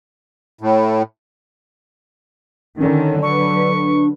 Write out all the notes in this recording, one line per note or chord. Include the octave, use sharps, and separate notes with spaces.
A2
D3 D#3 C#4
F#3 D4 B4 C#6